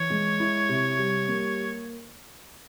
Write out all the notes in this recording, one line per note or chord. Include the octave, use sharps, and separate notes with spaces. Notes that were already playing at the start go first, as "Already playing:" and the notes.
Already playing: E3 C#5
G#3
E4
C3
G3
A#3